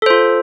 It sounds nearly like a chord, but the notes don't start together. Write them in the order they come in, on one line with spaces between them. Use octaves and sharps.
A4 C5 F4